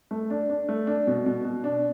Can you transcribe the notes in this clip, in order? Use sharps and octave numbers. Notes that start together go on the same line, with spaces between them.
A3
D4
D4
A3
D4
B2
B2
B2
D4